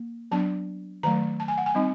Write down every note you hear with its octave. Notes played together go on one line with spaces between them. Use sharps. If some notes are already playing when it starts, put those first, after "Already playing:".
Already playing: A#3
F#3 B3 D4 A5
D#3 F#3 A3 A#5
A5
G#5
F#5
G#5
G3 C4 D#4